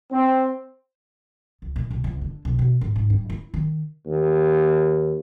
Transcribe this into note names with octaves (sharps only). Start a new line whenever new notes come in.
C4
C#2
A#2
C2
C#2
D3
B1
B2
G#2
G#2
G2
E4
D#3
D#2